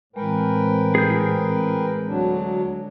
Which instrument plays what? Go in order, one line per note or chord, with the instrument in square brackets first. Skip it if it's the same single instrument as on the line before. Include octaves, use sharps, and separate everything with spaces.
[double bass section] A2 E3 C4 [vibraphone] G#3 [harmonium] A#4 B4 G5
[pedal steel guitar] G#4 G6
[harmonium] D2 F#3 D4